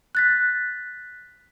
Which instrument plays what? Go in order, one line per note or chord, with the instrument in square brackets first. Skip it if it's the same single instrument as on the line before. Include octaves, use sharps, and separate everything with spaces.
[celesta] F#6 A6 B6